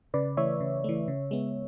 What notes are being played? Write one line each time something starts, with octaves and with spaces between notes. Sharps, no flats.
C#3 B4 D5
E3 A3 C#5 E5
C#3
E3 A3
C#3
G#3 B3